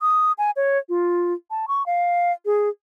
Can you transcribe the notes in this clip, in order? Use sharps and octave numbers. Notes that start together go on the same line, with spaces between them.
D#6
G#5
C#5
F4
A5
C#6
F5
G#4